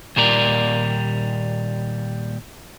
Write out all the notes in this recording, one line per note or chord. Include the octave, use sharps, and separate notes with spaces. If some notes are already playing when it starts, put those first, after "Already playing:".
D#2 A#2 G3 A#4 D5